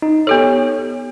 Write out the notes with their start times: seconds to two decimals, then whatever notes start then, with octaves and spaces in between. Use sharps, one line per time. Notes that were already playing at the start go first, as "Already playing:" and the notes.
0.02 D#4
0.27 B3 G4 A4 C#5